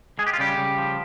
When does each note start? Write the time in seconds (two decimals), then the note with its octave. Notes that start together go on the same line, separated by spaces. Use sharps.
0.19 G#3 G#4
0.27 G4
0.33 F4
0.39 C#3 G3 G4
0.57 C#3
0.78 F3